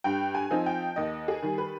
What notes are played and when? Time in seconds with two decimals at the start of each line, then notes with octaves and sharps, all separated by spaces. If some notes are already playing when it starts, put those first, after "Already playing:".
0.04 G2 G5
0.35 G#5
0.51 F3 C4 D#4
0.66 G5
0.96 D#2 D#5
1.28 G#4
1.42 D#3 G3
1.58 B4